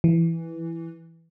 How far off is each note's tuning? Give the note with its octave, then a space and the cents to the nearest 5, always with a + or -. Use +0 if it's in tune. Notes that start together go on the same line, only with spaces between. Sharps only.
E3 +0